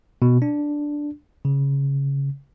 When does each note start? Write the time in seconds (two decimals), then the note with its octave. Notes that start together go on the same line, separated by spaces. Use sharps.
0.22 B2
0.42 D4
1.45 C#3